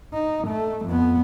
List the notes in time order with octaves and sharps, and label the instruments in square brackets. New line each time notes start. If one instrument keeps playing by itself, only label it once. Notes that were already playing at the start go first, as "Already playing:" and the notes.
[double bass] D#4
A3
F2 B3